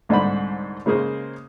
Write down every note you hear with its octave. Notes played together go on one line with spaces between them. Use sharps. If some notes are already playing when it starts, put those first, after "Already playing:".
C2 G#2 D3 D#4 C5 B5
C#3 G#3 A#3 G#4 C5